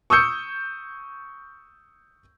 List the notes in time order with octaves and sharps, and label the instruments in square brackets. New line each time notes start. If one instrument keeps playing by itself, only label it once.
[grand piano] C#6 D#6 E6 G6 C#7